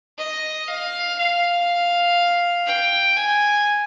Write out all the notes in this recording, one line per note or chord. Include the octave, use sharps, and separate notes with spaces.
D#5
F5
F5
G5
G#5